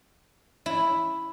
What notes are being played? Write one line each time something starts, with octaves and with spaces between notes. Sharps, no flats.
E4